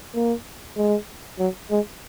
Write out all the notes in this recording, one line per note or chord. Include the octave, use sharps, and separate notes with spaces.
A#3
G#3
F#3
G#3